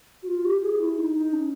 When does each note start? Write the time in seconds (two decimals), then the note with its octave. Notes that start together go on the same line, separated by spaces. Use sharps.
0.23 F#4
0.27 F4
0.45 G4
0.63 G#4
0.80 E4
0.98 D#4
1.15 D#4
1.33 C#4